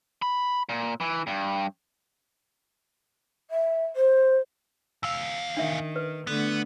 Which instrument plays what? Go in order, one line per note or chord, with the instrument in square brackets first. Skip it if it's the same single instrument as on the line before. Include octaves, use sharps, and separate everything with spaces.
[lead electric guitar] B5
A#2
E3
G2
[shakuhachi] E5
C5
[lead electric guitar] E2 F5 [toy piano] E6
[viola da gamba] D#3 [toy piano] D4 E5
[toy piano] B4
[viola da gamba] D3 A3 [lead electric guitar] B3